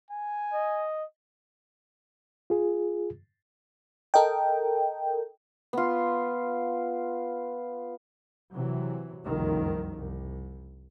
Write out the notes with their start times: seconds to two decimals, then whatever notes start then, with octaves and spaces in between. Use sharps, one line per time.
0.10 G#5
0.53 D#5
2.50 F4 G#4
4.14 A4 A#4 D#5 G5
5.73 B3 F4
8.52 C3 E3 F#3
9.24 F#1 C2 F2 D#3
9.96 C2